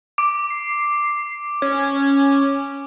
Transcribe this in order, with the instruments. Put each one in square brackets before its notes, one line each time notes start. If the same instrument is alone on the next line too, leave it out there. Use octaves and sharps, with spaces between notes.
[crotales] D6 D7
[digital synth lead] C7
C#4